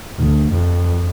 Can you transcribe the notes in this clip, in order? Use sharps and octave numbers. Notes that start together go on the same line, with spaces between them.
D2
F2